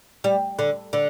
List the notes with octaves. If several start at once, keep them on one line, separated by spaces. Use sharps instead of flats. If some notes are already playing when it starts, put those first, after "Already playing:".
G3
D3
D3